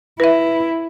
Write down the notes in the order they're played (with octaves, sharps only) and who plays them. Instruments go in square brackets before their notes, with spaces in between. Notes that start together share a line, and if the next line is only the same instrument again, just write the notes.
[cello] E4 [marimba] B4 E5